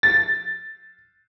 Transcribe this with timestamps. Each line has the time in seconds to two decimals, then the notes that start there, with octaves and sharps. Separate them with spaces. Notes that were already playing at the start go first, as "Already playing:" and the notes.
0.03 A6